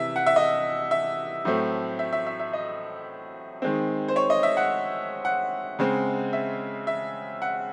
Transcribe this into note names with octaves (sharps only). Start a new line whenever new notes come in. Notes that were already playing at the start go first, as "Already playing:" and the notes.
Already playing: C3 E3 E5
F#5
E5
D#5
E5
A2 F#3 A3 C4
E5
E5
E5
E5
D#5
D#3 G#3 C4
C5
C#5
D#5
E5
F#5
F#5
C#3 G#3 C4
E5
E5
F#5